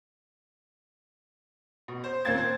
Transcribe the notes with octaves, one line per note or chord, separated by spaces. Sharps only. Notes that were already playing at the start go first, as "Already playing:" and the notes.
B2
C5
D#2 A#2 A#3 C4 G#6 A6
C5